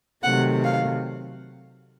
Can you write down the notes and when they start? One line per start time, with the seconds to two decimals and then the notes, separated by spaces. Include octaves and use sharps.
0.24 C3 D#3 F#3 A3 F#5
0.64 F5